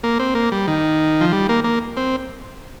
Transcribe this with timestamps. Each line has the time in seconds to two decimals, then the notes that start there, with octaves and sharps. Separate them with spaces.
0.03 A#3
0.19 C4
0.35 A#3
0.52 G3
0.68 D#3
1.21 F3
1.32 G3
1.49 A#3
1.64 A#3
1.97 C4